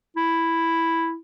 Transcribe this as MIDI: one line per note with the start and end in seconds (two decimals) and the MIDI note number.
0.17 1.16 64